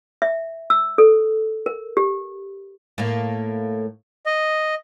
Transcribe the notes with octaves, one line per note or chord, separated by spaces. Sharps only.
E5
E6
A4
A#4
G4
A2 A#3
D#5